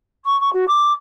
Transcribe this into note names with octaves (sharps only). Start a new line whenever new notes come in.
C#6
C#6
F#4
D6